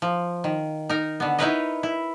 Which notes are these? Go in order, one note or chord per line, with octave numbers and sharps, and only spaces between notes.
F3
D#3
D#4 A#4
D3 B3
D#4 E4 A#4 B4 C#5 D#5
E4